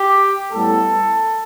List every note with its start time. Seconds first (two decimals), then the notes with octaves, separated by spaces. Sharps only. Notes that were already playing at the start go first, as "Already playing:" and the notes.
Already playing: G4
0.52 A2 G3 B3 A4